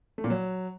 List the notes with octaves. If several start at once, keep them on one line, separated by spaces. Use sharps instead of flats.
A3
A#2
F#3